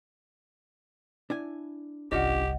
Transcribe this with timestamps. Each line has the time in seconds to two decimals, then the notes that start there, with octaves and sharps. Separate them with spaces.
1.30 D4 E4 G#5
2.12 G1 C2 C#4 D4 F4 G4 D#5 F#5